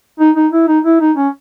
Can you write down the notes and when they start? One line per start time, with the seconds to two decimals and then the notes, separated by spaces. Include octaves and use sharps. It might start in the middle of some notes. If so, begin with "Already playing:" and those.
0.20 D#4
0.36 D#4
0.53 E4
0.68 D#4
0.85 E4
1.01 D#4
1.17 C#4